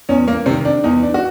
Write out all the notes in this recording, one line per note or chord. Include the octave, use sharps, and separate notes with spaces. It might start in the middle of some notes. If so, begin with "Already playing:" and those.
E2 C#4
A#3
C3 D#3 C4
D4
E2 D#4
D4
F#4